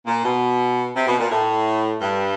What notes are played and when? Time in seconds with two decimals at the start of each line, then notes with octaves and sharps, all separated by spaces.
0.06 A#2
0.23 B2
0.95 C3
1.07 B2
1.19 A#2
1.31 A2
2.01 G2